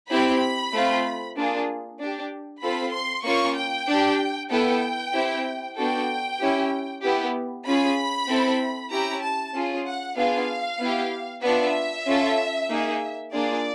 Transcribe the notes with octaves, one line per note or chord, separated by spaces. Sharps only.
C4 E4 G4 B5
A3 C4 F4
A#3 D4 F4 G#4
D4 G4
C4 F4 A4 B5
C6
A#3 C#4 F4 C#6
G5
D4 G4
B3 E4 A4 G5
C4 E4 G4
B3 D4 F#4 A4 G5
C#4 E4 G4
B3 E4 G4
C#4 F4 G#4 B5
C4 E4 A4
C#4 E4 G4 A#5
A5
C#4 F4 G#4
F#5
B3 D4 F4 G#4 F5
B3 E4 G4
B3 D4 F4 E5
C#4 F4 A4
A#3 D#4 G#4
A#3 D4 F4 G#4 D5